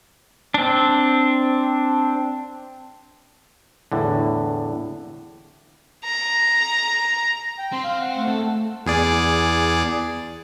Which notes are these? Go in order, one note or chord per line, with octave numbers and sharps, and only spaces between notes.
C4 D4
E2 A2 D3
A#5
G5
C4 C6
F5
F#5
A3
A4
E2 G#4 D5